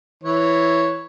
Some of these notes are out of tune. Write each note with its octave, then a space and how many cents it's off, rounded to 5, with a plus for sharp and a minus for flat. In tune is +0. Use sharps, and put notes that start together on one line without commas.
E3 +0 C#5 +0